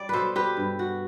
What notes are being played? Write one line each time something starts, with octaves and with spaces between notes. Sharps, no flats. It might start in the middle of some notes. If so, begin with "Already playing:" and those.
Already playing: G3 D5
B2 A4 B4 C5
G4 B4
G2
F#4